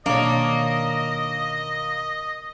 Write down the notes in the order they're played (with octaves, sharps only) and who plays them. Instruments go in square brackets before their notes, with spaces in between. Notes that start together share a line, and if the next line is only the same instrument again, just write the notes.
[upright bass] B2 D#3 [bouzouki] A#3 [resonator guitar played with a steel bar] D4 C#5 [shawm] D#5